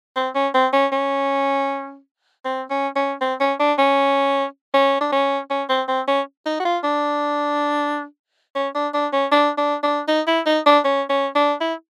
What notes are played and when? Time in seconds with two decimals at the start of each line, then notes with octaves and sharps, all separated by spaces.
0.16 C4
0.35 C#4
0.54 C4
0.73 C#4
0.92 C#4
2.45 C4
2.70 C#4
2.96 C#4
3.21 C4
3.40 C#4
3.60 D4
3.78 C#4
4.74 C#4
5.01 D4
5.12 C#4
5.50 C#4
5.69 C4
5.88 C4
6.08 C#4
6.46 D#4
6.60 F#4
6.65 F4
6.84 D4
8.55 C#4
8.75 D4
8.94 D4
9.13 C#4
9.32 D4
9.57 D4
9.83 D4
10.08 D#4
10.27 E4
10.46 D#4
10.66 D4
10.84 C#4
11.10 C#4
11.36 D4
11.61 E4